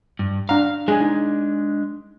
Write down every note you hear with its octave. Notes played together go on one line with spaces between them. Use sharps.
G2
D4 F5 F#5 A#5
G#3 D4 G#4 G#5
D#4